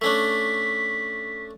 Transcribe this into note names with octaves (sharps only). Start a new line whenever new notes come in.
A3 C#4 D4 B6